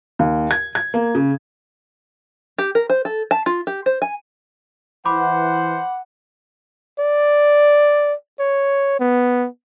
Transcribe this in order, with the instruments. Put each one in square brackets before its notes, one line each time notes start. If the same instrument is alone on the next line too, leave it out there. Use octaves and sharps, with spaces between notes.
[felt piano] D#2
G#6
G#6
A#3
C#3
[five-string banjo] G4
A#4
C5
A4
A5
F4
G4
C5
G#5
[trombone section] E3 [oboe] C5 [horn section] F#5 [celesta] B5 D6
[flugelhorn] D5
C#5
B3